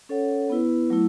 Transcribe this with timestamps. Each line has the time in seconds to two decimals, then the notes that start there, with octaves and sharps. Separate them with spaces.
0.09 C#4 A4 C#5 F#5
0.50 B3 E4 B4
0.90 F#3 A3 E4